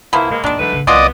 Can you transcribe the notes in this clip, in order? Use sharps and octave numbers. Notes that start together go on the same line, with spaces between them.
C2 F3 A#3 B3 E4
A#2 G#3 A#3
E2 A#2 D#3 G#3 D4
D3 E3 F#3 A3 B4
A#1 C#3
C2 F#3 B3 F4 D5 D#5 G#5 C6